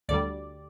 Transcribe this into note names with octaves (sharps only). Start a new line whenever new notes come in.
D2 D3 G3 D5